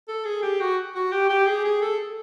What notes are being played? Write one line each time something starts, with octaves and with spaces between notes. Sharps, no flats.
A4
G#4
G4
F#4
F#4
G4
G4
G#4
G#4
A4